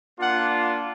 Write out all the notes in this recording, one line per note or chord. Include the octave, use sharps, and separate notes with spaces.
A#3 D4 F4 F#5